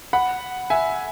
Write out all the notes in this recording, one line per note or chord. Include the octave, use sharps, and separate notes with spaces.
F#5 B5
E5 G#5